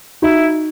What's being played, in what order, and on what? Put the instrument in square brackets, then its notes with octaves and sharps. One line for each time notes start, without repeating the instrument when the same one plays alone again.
[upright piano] D#4 F#4 [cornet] E4